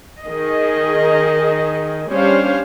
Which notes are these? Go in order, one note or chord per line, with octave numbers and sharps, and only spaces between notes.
D#3 G#4 D#5
G3 C#4 D4 C5 C#5 F5